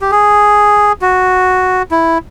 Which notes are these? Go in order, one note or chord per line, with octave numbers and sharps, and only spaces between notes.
G4
G#4
F#4
E4